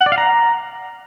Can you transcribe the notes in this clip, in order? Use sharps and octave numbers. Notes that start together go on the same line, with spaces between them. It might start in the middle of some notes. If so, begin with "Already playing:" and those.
F#5
D5
F5
A#5